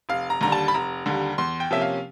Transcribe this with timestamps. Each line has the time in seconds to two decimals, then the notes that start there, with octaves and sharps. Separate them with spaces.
0.09 F1 F5
0.30 A#5
0.41 D#2 D3 G3 A#5
0.52 A5
0.68 B5
0.74 F1 A#5
1.06 D#2 D3 G3
1.38 E2 C6
1.60 G5
1.71 C3 F3 A#3 C#4 E5
1.81 F5